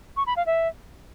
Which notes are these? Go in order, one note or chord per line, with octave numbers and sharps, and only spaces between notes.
C#6
B5
F5
E5